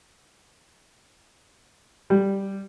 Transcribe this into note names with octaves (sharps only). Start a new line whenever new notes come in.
G3